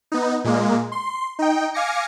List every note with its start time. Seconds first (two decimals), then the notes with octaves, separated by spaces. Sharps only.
0.12 B3 D#4
0.44 A#2 G#3 A#3
0.92 C6
1.39 D#4 G5
1.74 F5 G#5 D6 A#6 C#7